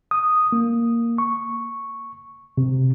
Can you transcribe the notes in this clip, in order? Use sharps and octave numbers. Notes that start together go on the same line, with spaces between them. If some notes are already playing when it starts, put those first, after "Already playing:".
D#6
A#3
C#6
C3